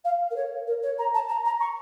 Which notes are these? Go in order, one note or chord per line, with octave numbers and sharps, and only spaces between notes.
F5
A#4
C#5
A#4
C#5
A#5
A5
A#5
A#5
C#6